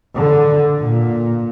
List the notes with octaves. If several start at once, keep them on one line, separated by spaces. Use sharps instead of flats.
D3
A#2